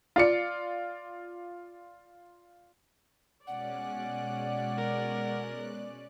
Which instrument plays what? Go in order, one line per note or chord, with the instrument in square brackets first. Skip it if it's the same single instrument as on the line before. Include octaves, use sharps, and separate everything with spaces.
[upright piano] F4 D5 C#7
[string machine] B2 G#3 F#6 [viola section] C#4 D5 [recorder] F#5
[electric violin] A#4